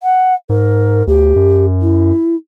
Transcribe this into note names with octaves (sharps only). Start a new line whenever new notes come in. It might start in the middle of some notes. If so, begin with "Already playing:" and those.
F#5
G#2 A#4
D2 G4
F#2
E4